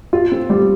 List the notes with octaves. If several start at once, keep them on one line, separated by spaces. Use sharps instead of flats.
F4
C4
G3